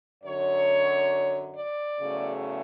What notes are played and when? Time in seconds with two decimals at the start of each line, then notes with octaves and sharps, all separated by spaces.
0.24 F#2 D3 F#3 C#5
1.55 D5
1.99 E2 C#3 F#3 A3